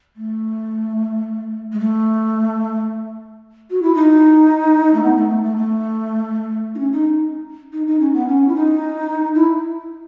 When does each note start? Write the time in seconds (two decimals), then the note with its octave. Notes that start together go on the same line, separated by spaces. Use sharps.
0.16 A3
1.72 G#3
1.79 A3
3.70 F#4
3.82 E4
3.94 D#4
4.94 A3
5.02 B3
5.16 A3
5.29 A3
5.43 A3
5.57 A3
6.74 D#4
6.78 C#4
6.92 D#4
7.72 D#4
7.86 D#4
7.99 C#4
8.13 B3
8.27 C#4
8.48 E4
8.54 D#4
9.35 E4